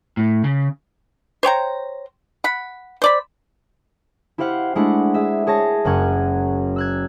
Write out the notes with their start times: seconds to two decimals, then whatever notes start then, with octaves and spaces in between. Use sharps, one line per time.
0.17 A2
0.44 C#3
1.43 C5 C#5 G5 A#5
2.44 F#5 B5
3.02 C5 D5 B5
4.38 E4 G4 C5 F5 F#5
4.75 G#3 A3 D4 E4 F#5
5.14 G#4 E5
5.47 G#4 C#5 A5 A#6
5.85 F#1 F#2 C#4 F#5 G#6
6.76 E6 F#6 G#6